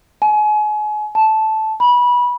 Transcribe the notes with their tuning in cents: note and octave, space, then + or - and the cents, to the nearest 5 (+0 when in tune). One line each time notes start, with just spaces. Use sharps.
G#5 +35
A5 -10
B5 -20